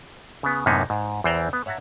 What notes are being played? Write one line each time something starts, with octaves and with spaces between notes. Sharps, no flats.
C#3 B3
F#2 A2 C3 A#3 B3 D#4
G#2
E2 E3 C5 D5 G5 A#5
B3
C#5 E5 F#5 A5 A#5